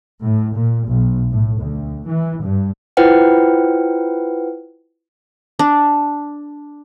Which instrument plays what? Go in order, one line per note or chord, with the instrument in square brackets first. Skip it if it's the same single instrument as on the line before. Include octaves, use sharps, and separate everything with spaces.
[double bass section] A2
A#2
B1
A2
D2
E3
G2
[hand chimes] E4 F4 B4 C5 F#5 G5
[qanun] D4